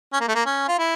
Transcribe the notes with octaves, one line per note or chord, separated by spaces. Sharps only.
C#4
A#3
A3
A#3
C#4
F4
E4